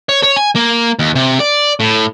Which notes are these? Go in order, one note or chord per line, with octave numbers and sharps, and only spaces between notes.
C#5
C#5
G#5
A#3
D#2
C3
D5
A2